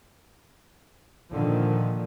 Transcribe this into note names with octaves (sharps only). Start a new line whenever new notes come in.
A#2 D3 D#3 F3